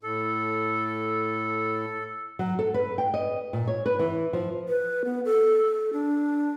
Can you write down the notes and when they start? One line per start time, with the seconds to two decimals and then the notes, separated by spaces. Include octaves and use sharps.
0.03 A2 A4
2.39 F#3
2.59 A4
2.74 B4
2.98 G5
3.14 D#5
3.53 A#2
3.67 C#5
3.86 B4
3.99 E3
4.33 F3
4.68 B4
5.05 B3
5.25 A4
5.93 D4